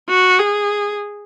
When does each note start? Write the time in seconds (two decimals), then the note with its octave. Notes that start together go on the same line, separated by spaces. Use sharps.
0.09 F#4
0.39 G#4